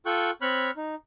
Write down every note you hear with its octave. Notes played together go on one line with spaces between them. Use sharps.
F4 A4 G5 C#6 F#6
C4 C#5 B5 C#6 F6 F#6
D#4